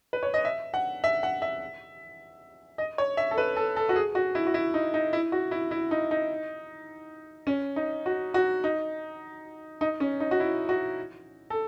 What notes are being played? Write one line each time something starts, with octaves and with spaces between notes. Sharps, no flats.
B4
C#5
D#5
E5
F#5
E5
F#5
E5
D#5
C#5
E5
A4
B4
A4
A4
F#4
G#4
F#4
E4
F#4
E4
D#4
D#4
E4
F#4
E4
E4
D#4
D#4
C#4
D#4
F#4
F#4
D#4
D#4
C#4
D#4
F#4
E4
F#4
A4